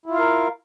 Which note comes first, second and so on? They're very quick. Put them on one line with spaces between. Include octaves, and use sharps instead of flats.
E4 F4 F5 A#4